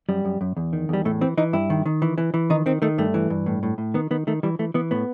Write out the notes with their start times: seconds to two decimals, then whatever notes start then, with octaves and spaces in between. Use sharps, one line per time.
0.09 F#2 G3
0.25 F#2
0.41 F#2
0.57 E2
0.73 D#3
0.89 E2 G3
1.05 A2 A3
1.21 E3 C4
1.37 E3 D#4
1.53 G2 E4
1.70 D#3
1.86 D#3
2.02 E3
2.18 E3
2.34 E3
2.50 D#3 D#4
2.66 D#3 C4
2.82 D#3 A3
2.98 G2 A3
3.14 E3
3.30 G2
3.46 A2
3.63 A2
3.78 A2
3.94 D#3 B3
4.11 D#3 B3
4.27 D#3 A3
4.43 E3 G3
4.59 E3 A3
4.74 E3 B3
4.91 A2 B3